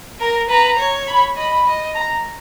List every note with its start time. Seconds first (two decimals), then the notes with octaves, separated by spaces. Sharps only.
0.20 A#4 A#5
0.49 B4 A#5
0.79 C#5
1.08 B5
1.37 D#5 B5
1.67 D#5
1.95 A#5